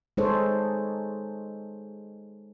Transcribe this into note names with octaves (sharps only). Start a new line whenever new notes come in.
G#3 D#4 G#4 A4 C5 C#5